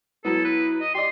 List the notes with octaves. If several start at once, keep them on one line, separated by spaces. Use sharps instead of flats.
F#3 B3 E4 A4
B4
D#5
G4 D5 D#5 C6